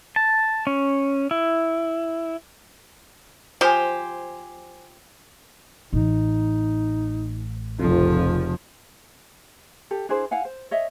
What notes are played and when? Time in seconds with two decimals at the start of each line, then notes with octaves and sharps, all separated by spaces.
0.16 A5
0.67 C#4
1.31 E4
3.61 F3 G4 C5 G#5
5.93 A1 D#4
7.80 F1 F2 C#3 F3
9.91 G4 A4
10.09 D4 E4 G#4 C5
10.31 E4 F5 F#5 G#5
10.45 C5
10.71 C#5 D#5 E5